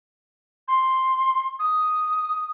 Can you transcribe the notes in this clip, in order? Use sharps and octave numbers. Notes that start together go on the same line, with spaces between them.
C6
D#6